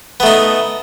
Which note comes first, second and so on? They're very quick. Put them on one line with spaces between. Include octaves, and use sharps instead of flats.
B3 A3 D#4